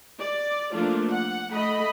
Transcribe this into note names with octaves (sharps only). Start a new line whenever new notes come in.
D5
F3 A3 A#3 D4 F4
F#5
A3 D#5 B5